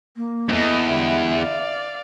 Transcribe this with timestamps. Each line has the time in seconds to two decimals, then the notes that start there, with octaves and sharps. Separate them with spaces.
0.16 A#3
0.49 E2 G2 A4 D#5
0.88 D3 G3 G#3 E5
1.36 D5 F5